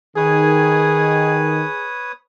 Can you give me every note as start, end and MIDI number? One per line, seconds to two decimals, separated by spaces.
0.17 1.63 51
0.17 1.88 68
0.17 2.12 71
0.17 2.12 73
0.17 2.12 87